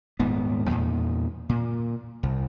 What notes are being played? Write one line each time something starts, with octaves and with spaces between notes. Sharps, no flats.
D#1 G#2 B3
E2 A#2
A#2
C2